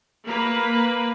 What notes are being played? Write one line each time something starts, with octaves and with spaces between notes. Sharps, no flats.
A#3 B4